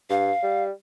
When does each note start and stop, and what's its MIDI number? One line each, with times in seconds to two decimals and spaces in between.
0.10 0.32 43
0.10 0.63 77
0.43 0.71 55